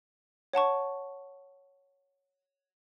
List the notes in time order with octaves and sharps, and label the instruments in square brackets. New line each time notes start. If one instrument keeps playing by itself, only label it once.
[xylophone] C#5 F#5 A5 C#6